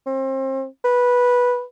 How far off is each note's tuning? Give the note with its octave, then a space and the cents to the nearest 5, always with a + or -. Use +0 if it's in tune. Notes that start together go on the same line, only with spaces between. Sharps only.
C4 +35
B4 -10